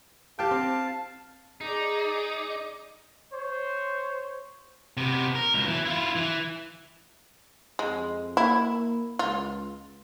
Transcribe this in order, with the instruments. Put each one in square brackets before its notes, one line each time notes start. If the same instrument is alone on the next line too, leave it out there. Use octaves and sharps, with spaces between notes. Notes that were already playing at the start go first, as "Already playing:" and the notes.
[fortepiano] G4 G5 [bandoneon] F5 A5
[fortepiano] C4
[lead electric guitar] D#4 [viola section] G#4 D5
[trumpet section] C5 C#5
[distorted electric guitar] C3 B3
A#4
C#2 B2
E3
E4 F4
E3
[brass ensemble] F2 [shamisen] G#3
[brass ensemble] A#3 [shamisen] E4
[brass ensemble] C#2 [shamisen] F4